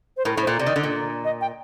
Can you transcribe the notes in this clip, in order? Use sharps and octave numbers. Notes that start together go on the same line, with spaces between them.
C5
A2 A#4
A2
C5
A#2
C3 D5
D#3
D3
A#2
D#5
G5